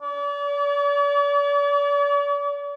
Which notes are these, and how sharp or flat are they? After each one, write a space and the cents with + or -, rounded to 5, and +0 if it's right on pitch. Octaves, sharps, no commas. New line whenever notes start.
D5 -45